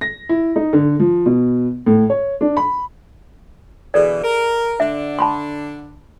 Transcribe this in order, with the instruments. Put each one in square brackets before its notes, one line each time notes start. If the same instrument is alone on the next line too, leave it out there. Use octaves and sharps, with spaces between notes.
[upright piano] A#6
E4
D#4
D3
F3
B2
A2
C#5
D4
B5
[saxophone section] B2 D3 E3 [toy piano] G#4 A4 D5
[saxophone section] A#4
[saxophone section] D3 D4 [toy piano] E5
[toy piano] A5 B5 C6